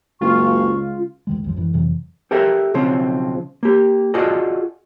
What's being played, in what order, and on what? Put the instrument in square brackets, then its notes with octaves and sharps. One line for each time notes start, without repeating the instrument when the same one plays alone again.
[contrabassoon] F#1 [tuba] C#2 [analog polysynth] F4 [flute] C#6
[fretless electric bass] D2 D#3 G#3
C2 F#2 F3
G#1 F#2 E3
F2 C3 E3 F#3
[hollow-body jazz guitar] G4 A4 A#4 C#5 E5
B1 C#3 F3 C4
A#3 G4
F4 F#4 G#4 A4 D5 D#5